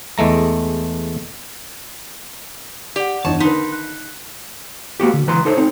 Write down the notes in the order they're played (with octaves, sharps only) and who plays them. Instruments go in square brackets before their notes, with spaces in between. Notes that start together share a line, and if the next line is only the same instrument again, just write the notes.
[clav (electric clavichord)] E2 G#3 A3 A#5
[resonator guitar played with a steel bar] G4 [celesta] D5 F#5
[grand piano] G1 E2 [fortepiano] D#4 C#5 [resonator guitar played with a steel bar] A5
[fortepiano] D3 D#3 B4 [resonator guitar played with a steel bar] D#4 [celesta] A#4 C6 [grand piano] B6
[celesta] F#6
[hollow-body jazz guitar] A#3 C#4 F#4 G4
D3
C#2 E3 B4 A#5 C6
D#4 A4 C5 C#5
C4 D#4